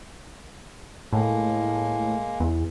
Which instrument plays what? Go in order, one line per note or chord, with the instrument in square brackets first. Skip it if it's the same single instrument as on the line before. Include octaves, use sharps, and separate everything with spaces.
[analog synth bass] A2 [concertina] G#3 A#3
[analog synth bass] E2